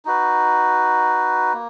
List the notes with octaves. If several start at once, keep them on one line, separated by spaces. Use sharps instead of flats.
D#4 F#4 B4
A#3